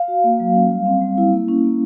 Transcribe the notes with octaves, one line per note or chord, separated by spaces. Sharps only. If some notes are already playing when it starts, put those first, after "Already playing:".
Already playing: F5
F#4
A#3
F#3
C#4
G3
C4
G3
E4
A#3
C#4
A#3